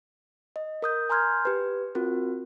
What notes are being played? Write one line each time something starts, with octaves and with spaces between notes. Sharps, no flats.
D#5
A#4 D#6 G6
G#5 A#5 C6 F6 G6 G#6
G4 B4
C4 F4 F#4 A#4